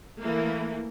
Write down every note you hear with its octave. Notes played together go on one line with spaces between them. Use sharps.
E3 A3 A#3